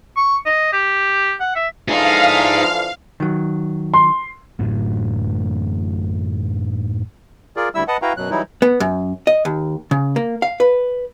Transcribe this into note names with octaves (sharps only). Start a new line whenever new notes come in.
C#6
D#5
G4
F#5
E5
D3 E3 F3 D#4 G#4 F5
D#3 F#3
C6
A1 F#2 A2 D3
F4 G#4 A#4 D5
D2 G3 E4 E5 E6
B4 D#5 F#5 A5
E4 F#4 B4 F5 G5 A#5
F#2 B2 F#3 F#6
E3 F#3 G3 D#4 E4
B3
F#2
D#5
D#2
C#3
A#3
F5
B4